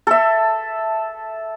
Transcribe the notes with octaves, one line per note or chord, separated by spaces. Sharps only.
A4 E5